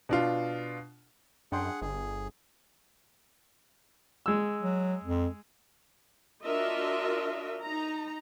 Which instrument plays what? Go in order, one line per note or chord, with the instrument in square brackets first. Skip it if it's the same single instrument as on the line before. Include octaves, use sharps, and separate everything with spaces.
[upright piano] B2 D4 F4
[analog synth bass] F#2 [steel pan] D4 G5 C6 [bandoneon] G#4 F#5
[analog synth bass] G1 [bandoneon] G#4
[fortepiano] G#3 E6
[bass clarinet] F#3
F2
[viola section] D4 F4 F#4 A#4 D#5 E5
D#4 A#5